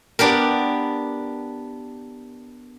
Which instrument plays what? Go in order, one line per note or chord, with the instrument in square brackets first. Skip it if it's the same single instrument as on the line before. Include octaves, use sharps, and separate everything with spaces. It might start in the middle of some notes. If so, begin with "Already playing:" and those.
[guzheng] B3 D4 G4 A#4